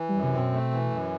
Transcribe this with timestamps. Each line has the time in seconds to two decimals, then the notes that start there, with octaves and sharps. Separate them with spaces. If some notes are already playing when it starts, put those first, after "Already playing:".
Already playing: E3
0.09 F#2 G3
0.23 C3
0.33 B2 C4
0.52 A3
0.71 E3
0.90 F#2